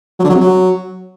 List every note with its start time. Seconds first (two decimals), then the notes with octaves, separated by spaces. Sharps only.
0.19 F#3
0.24 D3
0.30 F#3
0.35 C3
0.40 F#3